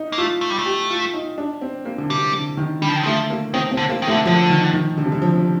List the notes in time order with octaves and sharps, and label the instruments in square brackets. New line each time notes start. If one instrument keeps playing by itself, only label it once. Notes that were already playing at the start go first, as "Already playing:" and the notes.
Already playing: [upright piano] D#4
[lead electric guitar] A#3
[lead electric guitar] A3 [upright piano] F4
[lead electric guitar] A3
G3
A3
[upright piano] G4
F4
D#4
D4
C4
A#3
D3
[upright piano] C3 [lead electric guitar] G3
[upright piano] D3
D#3
[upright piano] D3 [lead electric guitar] G3
[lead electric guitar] F3
D#3
[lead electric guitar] F3 [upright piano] A3
[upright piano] A#3
[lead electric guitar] D#3 [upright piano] C4
[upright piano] C4
[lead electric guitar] D3
[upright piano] A#3
[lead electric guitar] D#3
[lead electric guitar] D3 [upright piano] A3
[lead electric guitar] D3 [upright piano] F3
[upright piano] D#3
D#3
D3
C3
D3
F3
F3